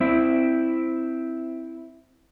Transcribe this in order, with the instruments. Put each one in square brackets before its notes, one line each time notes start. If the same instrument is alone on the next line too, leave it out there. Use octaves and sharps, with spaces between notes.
[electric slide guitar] C4 E4